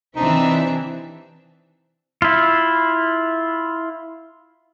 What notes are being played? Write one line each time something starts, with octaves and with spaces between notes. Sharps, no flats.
C3 E3 C4 D4 D#4 E5
E4 F4